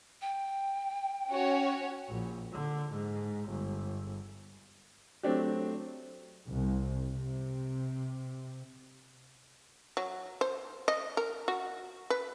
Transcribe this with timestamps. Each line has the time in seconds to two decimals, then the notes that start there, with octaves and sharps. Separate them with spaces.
0.22 G5
1.29 C#4 F#4 C#5
2.09 A#1
2.53 D3
2.92 G#2
3.49 G1
5.23 F#3 A3 C4 D4 G4
6.49 C2
7.14 C3
9.97 F#3
10.41 C5
10.88 D#5
11.17 A#4
11.48 F#4
12.10 B4